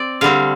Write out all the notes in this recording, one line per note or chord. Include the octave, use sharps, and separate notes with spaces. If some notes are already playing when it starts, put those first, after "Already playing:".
Already playing: C4 D5
D3 G3 C4 F5